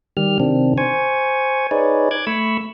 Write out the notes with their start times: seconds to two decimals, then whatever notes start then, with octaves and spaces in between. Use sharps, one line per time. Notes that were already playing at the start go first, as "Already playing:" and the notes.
0.17 D#3 G3 G4 F6
0.40 C3 D#3 C4 D4
0.78 C5 G#5 C#6
1.71 D#4 G#4 B4 C#5 D5
2.11 D6 F#6 G#6
2.27 A3 B5 C#6 E6